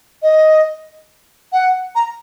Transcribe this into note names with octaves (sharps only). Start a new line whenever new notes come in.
D#5
F#5
A#5